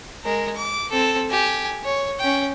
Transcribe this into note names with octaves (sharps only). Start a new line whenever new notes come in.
G#3 A#4
D6
C4 A4
G4 G#5
C#5
C#4 G5